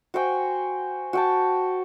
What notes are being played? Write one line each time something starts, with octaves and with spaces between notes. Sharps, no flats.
F#4 C5 G5 G#5
F#4 G5 A5